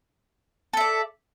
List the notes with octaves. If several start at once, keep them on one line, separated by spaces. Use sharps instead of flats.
A4 D5 E5